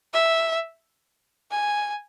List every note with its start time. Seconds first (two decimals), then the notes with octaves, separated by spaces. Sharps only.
0.13 E5
1.51 G#5